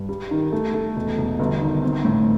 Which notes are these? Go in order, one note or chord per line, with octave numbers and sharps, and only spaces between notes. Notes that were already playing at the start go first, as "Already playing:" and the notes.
Already playing: G2
G3
D#3
A3
A3
E1
E1
G1
D#3
C4
A2